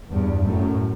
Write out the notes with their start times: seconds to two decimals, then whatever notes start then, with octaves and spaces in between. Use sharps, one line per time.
0.13 E2 G2
0.46 F#2 A2